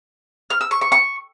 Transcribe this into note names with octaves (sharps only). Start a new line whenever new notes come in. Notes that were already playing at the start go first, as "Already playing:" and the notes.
F6
E6
C#6
C#6
C#6